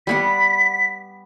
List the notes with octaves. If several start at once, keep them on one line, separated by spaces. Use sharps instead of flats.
G3 B3 F#5 B6